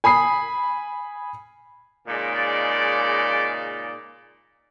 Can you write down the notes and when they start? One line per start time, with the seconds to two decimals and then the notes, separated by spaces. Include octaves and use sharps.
0.04 G#5 B5 D#6 C7
2.08 A#2 C#3 G#3 D#4 D5